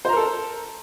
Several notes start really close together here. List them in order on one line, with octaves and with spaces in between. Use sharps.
C5 A#5 A#4 A4